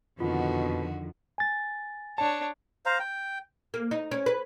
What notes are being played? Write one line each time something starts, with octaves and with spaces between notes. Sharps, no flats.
F2 B2 D3 D#3 F4 F#4
G#5 A6
D4 C#5 A5
C5 F5 A#5
G5
A#3
D#4
C#4
B4